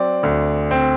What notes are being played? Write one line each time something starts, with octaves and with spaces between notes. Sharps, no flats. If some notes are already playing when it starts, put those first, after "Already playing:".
Already playing: F#3 C4 D5
D2
C4